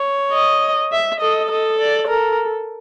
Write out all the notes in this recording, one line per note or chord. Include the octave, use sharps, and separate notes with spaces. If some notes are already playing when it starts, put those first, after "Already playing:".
Already playing: C#5
D#5
E5
A4 D#5
A4 D#5
D5
A4 A#4